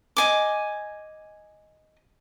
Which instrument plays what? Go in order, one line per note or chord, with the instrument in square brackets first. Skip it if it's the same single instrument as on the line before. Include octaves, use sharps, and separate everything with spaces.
[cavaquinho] D#5 G#5 D6